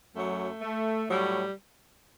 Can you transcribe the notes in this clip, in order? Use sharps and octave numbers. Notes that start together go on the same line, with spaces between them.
F#2 F#3 A3
A3
A2 F#3 G3